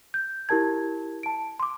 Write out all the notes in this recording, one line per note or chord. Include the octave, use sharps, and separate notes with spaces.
G6
E4 G4 A#4 A5 G#6
A5 D7
C6 D6